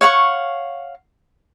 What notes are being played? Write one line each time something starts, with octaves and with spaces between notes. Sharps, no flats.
C#5 F5 F#5 C#6